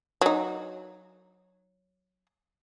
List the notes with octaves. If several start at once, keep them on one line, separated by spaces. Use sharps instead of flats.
F#3 D#4